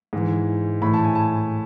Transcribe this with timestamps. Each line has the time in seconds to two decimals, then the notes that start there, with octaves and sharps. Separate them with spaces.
0.13 G#2 E3
0.82 A2 E3 B5
0.94 A5
1.04 G#5
1.15 A5